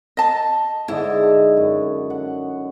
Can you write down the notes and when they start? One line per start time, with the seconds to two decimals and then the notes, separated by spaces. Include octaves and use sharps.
0.17 D#5 A5
0.88 G#2 D3 E4 D#5
1.57 F#2
2.10 F#5